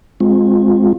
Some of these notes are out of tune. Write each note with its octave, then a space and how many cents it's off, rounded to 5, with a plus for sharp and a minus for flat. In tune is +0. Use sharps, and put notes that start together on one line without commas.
G#3 +0 C4 +5 F4 +20